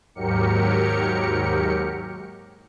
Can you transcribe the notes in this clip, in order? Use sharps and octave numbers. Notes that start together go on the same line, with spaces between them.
D#2 G#2 F#3 G4 A#4 C#7